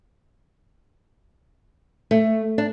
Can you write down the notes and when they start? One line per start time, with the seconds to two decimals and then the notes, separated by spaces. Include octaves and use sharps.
2.11 A3
2.58 D4